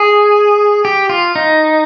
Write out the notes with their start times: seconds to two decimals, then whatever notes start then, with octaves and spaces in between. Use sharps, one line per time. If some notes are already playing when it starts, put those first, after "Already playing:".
Already playing: G#4
0.85 G4
1.10 F4
1.36 D#4